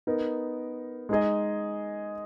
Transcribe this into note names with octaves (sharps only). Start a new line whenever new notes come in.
B3 D#4 A#4
G#3 D#4 G#4 D#5